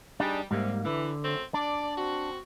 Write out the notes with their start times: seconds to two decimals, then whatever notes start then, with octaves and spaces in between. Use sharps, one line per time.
0.20 G3 D4 D#4 G#4
0.51 G#2 C3 G3 A#3
0.85 D3 E3
1.23 F#2 A3 C4
1.54 D4 D5
1.97 C4 F#4